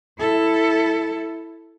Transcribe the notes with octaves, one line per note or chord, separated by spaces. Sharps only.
E4 A4